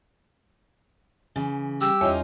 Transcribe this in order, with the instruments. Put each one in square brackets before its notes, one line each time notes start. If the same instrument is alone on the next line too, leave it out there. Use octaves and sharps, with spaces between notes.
[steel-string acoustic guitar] C#3 E3
[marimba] G3 [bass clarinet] G4 [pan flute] E6
[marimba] E2 C#5 E5 [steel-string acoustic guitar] C#4 D#4 F4